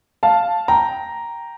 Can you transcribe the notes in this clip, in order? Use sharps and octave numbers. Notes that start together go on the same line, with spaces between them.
F5 A5
G5 A#5